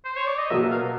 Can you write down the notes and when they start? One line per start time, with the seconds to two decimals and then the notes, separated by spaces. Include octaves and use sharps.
0.05 C5
0.16 C#5
0.27 D5
0.38 D#5
0.50 B2 F#3 A#3 E5
0.71 F5